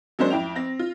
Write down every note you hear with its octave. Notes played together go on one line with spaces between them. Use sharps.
F#3 G#3 A#3 C#4 D4 C5
F2 E4 G5 F7
C4 A#6
F4